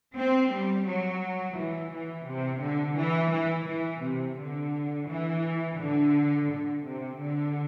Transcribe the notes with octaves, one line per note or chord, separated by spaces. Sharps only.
C4
G3
F#3
E3
E3
C3
D3
E3
E3
E3
C3
D3
E3
D3
D3
C3
D3